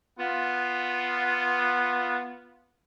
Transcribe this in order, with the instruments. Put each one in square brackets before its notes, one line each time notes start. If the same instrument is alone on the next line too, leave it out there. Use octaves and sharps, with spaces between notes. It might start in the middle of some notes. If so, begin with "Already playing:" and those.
[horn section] B3 F4